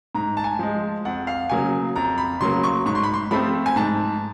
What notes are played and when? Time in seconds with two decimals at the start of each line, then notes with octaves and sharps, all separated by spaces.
0.15 G#2 A#5
0.37 A5
0.44 G#5
0.59 F3 G#3
1.05 F2 F#5
1.27 F5
1.49 C#3 F#3 A#3 G#5
1.96 F2 A#5
2.18 B5
2.40 C#3 F#3 A#3 C6
2.63 C#6
2.86 G#2 C#6
2.95 C6
3.03 B5
3.14 C6
3.31 F3 A3 C4 B5
3.66 G#5
3.76 G#2 A5